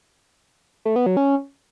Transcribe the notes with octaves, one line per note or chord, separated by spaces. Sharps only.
A3
B3
F#3
C#4